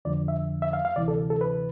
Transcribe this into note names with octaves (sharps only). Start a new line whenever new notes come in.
F2 D3 F3 D5
E5
E5
F5
F5
D2 C3 E3 D5
A4
A4
B4